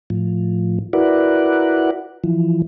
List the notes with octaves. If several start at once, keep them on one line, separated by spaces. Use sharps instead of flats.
A2 F3
E4 F#4 A#4 B4 D5 F#5
E3 F3